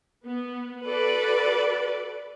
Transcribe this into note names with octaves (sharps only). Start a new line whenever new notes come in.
B3
F#4 A4 B4 D5